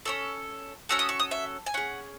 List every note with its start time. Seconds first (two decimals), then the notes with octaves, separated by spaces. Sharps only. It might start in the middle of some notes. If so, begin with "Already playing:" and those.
0.05 C#4 F#4 A4 E6
0.89 C#4 F#4 A4 E6
0.99 D#6
1.09 C#6
1.19 D#6
1.31 E5
1.66 G#5
1.74 C#4 G#4 F#5